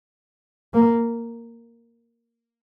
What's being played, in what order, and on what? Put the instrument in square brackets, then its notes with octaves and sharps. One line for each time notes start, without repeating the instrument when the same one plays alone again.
[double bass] A#3